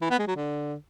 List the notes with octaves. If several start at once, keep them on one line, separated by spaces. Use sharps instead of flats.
E3
B3
G#3
F#3
D3